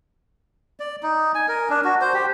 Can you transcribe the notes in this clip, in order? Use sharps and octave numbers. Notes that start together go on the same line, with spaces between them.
D5
D#4
G#5
A#4
D4
F#4
C5
G4